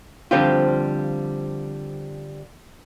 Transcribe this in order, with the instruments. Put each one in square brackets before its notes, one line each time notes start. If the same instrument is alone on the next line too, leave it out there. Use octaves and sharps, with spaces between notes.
[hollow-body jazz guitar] D3 F3 G3 C4 F4